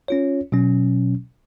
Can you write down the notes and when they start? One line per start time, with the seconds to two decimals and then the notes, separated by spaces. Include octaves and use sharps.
0.08 C#4 F4 C#5
0.52 B2 F#3 C#4